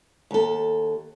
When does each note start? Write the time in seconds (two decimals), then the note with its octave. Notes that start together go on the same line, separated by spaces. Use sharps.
0.31 D#2 A4